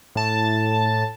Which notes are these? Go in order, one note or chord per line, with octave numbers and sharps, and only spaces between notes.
A2 A5